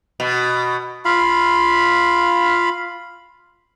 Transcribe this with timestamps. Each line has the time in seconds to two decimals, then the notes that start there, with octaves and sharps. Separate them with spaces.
0.20 B2
1.05 F4 F5 B5